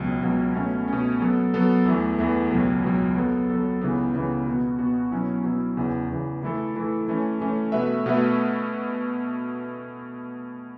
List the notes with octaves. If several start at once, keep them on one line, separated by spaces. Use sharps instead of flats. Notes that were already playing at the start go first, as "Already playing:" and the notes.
Already playing: C#2 B2 F#3
C#2 B2 F#3
B2 A3 C#4
B2 A3 C#4
F#3 B3 A4
F#3 B3 A4
E2 E3 A3
E2 E3 A3
C#2 B2 F#3
C#2 B2 F#3
F#3 B3 A4
F#3 B3 A4
C#2 C#3 E3 B3
C#2 C#3 E3 B3
B2 B3 F#4
B2 B3 F#4
B2 F#3 C#4 E4
B2 F#3 C#4 E4
E2 C#3 E3
E2 C#3 E3
E3 A3 E4 A4
E3 A3 E4 A4
E3 A3 C#4
E3 A3 C#4
B2 A3 F#4 B4 E5
B2 A3 F#4 B4 E5